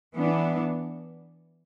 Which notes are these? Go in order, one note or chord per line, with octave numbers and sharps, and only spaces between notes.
E3 B3 D4